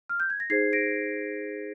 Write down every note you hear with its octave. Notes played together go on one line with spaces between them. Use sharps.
F6
G6
G#6
A#6
D#4 G#4 C5 G#6 C7
A#6 D7